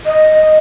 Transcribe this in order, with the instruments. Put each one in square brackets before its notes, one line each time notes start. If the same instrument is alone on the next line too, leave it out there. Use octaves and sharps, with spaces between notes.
[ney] D#5